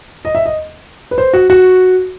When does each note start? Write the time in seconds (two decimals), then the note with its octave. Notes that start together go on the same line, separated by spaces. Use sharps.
0.25 D#5
0.35 E5
0.46 D#5
1.11 B4
1.18 C5
1.33 F#4
1.50 F#4